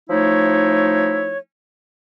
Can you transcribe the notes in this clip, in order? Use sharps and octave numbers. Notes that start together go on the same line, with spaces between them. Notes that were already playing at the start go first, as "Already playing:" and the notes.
F3 A3 D#4 E4 C#5